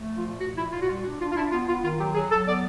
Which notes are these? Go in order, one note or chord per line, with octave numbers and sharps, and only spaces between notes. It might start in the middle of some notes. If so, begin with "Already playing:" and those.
Already playing: A3
F3
F4
A#2
A#2 F#4
A#2 E4
A#2 F4
F#4
G3 F4
D4 F#4
D4 F4
F4
D4 E4
B3 F4
B3 F4
D#3 F4
F#3 G4
F#3 G#4
F#3 A4
B3 D5